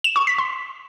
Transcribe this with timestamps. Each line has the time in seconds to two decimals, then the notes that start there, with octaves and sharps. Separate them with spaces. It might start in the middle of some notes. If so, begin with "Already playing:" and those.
0.04 E7
0.16 C#6
0.27 B6
0.38 C6